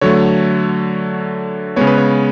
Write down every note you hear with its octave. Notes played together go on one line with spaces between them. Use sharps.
D3 F#3 A3 C#5
C#3 G#3 B3 C#5
B4
C#5